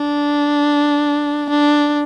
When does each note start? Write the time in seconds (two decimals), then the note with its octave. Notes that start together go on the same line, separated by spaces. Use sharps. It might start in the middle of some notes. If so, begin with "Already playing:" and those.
Already playing: D4
1.50 D4